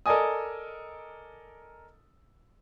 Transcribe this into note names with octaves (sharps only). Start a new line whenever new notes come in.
A4 A#4 D5 D#5 G#5 D#6